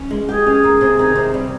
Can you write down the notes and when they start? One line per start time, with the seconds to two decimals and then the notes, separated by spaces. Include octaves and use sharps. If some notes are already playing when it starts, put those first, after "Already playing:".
Already playing: C#4
0.11 G#3
0.29 G4 G#4
0.46 C#4
0.64 A#3
0.81 C3
0.99 D#3
1.16 C3
1.34 G3